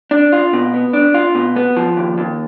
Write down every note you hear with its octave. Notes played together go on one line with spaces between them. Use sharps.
D4
F4
B2
B3
D4
F4
B2
B3
F3
D#2
D#2